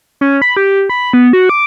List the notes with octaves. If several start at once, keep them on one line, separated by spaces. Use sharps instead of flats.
C#4
B5
G4
B5
B3
F#4
D6